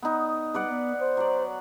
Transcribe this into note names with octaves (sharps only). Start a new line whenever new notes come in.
B3 D#4
G3 B4 D5 F#5
B3
C5
F#3 D5